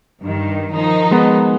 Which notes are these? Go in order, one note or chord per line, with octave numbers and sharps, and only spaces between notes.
G2 D#3
D#3 F3 D#4
G#3 B3